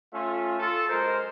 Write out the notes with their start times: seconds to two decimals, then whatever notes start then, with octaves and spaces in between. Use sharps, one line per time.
0.13 A3 C#4 F4
0.60 F4 A4
0.90 F#2 G#3 A#4 C5